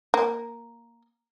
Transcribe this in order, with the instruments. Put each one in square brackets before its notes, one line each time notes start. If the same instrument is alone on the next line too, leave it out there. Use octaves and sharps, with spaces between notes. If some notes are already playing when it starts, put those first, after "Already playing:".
[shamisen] A#3